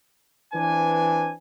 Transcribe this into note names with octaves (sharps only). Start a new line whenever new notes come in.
E3 C4 D4 B4 G#5